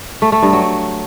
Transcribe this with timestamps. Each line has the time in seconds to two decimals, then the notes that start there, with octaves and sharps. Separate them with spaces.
0.22 A3
0.32 A3
0.42 G2
0.53 F#3